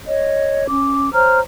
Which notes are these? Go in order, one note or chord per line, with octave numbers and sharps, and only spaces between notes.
C#5 D#5
C#4 D6
C5 C#5 A#5 F6